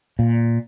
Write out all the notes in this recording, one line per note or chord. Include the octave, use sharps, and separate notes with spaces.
A#2